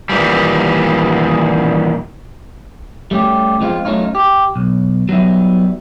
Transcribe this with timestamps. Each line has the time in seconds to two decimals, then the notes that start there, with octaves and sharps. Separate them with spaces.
0.09 A#2 D#3 E3 G3
3.11 G3 A3 C#4 G4
3.61 F3 G#3 C4 E4 F4
3.85 F#3 A3 C#4 D#4 F4
4.15 G4
4.56 B1
5.09 F#3 G3 B3 D#4 E5